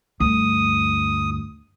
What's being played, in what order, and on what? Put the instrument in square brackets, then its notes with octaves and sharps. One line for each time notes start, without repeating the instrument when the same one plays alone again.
[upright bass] D2 G2 [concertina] D#6